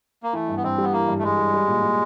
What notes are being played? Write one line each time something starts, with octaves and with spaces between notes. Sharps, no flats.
A#3
E3 A3
G2
B3
G2 C4
G3
B3
E3 A#3
G2
A3
G2 G#3
G3
G3
A#2
A#2